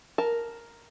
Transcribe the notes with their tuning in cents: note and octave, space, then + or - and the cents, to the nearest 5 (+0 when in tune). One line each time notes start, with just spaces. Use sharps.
A#4 +0 A5 -10